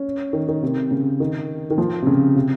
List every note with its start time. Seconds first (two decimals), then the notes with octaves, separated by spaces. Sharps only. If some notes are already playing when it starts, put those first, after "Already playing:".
Already playing: C#4
0.33 D#3
0.48 D#3
0.63 C3
0.91 C#3
1.20 D#3
1.70 D#3
1.78 F3
2.02 C3
2.07 C#3
2.36 C3